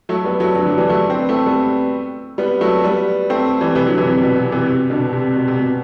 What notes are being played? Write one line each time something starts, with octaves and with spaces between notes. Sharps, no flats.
F#3 A3
G3 B3
F#3 A3
D3 F#3
D3 F#3
E3 G3
F#3 A3
C4
B3
A3 C4
G3 B3
G3 B3
F#3 A3
G3 B3
A3 C4
E3 G3
C3 E3
D3 F#3
C3 E3
C3
B2
C3
C3 E3
C3
B2 D3
C3
B2
C3
B2